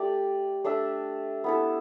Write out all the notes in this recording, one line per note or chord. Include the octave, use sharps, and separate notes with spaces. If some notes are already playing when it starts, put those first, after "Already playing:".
Already playing: A3 G4 D5
A3 D4 A4 E5
B3 E4 A4